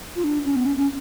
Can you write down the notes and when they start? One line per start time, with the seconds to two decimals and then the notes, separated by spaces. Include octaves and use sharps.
0.16 F4
0.24 D4
0.45 C#4
0.56 B3
0.66 C#4
0.77 C#4